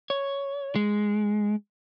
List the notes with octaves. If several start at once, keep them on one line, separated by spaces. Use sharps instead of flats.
C#5
G#3